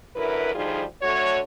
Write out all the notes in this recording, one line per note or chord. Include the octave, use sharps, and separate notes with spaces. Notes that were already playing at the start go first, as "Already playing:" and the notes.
F#2 D3 E4 A#4 B4
D2 F3 G3 D#4 F4 G#4
D3 A3 F#4 C#5